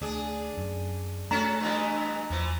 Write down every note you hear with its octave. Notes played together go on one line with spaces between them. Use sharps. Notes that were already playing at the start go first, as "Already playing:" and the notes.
D2 D4 G#4
F#2
A3 C#4 F#4 A4 A#5
G2 B2 E3
E2 E3 F3